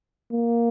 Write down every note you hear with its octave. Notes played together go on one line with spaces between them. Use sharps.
A#3